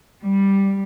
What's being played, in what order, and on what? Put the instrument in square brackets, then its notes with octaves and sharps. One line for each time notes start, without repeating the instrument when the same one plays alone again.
[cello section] G3